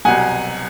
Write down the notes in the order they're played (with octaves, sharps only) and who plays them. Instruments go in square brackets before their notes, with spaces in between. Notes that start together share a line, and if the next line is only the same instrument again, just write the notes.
[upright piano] C2 B2 F#3 F#5 G#5